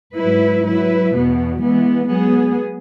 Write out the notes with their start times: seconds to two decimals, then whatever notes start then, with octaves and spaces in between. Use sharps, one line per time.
0.17 G#2 F#3 E4 B4
0.65 F#3 E4 B4
1.12 E2 B2 B3
1.61 E3 G#3 B3
2.09 F#3 B3 G#4